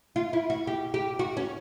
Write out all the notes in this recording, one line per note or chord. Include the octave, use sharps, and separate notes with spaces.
F4
E4
F#4
G4
G4
F#4
C#4